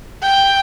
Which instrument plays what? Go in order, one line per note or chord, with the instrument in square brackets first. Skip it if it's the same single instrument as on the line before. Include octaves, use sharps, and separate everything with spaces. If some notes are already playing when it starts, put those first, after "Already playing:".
[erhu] G5